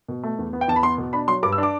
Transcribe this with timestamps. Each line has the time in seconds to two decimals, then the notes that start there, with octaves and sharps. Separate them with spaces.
0.08 B2
0.23 A3
0.39 E2
0.53 B3
0.61 G5
0.68 E2 A5
0.76 B5
0.83 B3 C6
0.98 B2
1.13 D4 B5
1.28 F#3 C6
1.43 G2 D6
1.52 E6
1.58 D4
1.63 D6